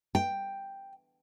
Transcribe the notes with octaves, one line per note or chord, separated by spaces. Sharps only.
G5